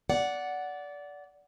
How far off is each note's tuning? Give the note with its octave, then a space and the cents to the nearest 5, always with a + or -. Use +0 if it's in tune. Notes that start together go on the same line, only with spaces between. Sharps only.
D5 -20 F#5 +0